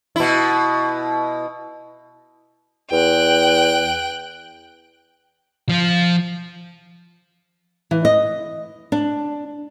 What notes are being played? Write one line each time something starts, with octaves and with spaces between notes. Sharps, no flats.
B2 E4
E2 G5 F#6
F3 F4
E3
D#5
D4